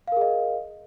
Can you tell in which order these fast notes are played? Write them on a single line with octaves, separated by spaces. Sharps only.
F5 A#4 G#4 D#5